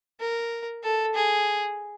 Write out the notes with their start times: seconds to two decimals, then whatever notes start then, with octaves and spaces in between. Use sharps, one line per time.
0.20 A#4
0.83 A4
1.15 G#4